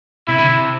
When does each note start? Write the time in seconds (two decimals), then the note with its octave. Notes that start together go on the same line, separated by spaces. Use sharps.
0.28 C3 E4
0.38 D3
0.49 C3